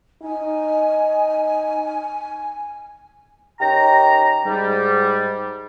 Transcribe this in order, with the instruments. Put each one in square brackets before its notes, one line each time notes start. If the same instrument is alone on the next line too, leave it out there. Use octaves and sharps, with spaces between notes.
[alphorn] D#4 [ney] G#5
[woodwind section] D#3 C#4 G4 G5 A#5
G#2 G3